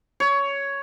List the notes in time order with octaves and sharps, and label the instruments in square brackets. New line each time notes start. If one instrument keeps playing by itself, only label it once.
[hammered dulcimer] C#5